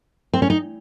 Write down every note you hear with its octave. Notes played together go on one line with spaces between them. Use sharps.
C4
C#4
D#4